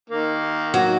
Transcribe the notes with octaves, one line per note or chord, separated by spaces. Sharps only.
D#3 A#3
F#3